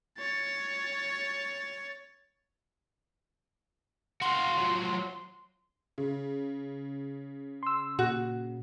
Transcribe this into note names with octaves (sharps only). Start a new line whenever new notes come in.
C#5 A6
F#4 F5 C6
F3 F#3
C#3
C6 E6
A#2 F#4